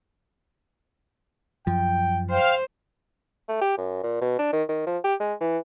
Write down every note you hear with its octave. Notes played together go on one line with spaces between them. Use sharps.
F#2 F3 G5
C5 F5 G5
A3
G4
F#2
A#2
B2
D4
D#3
D#3
F3
G4
G#3
E3